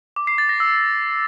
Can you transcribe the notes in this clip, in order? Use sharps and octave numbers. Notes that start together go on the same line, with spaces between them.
D6
C7
A6
A#6
E6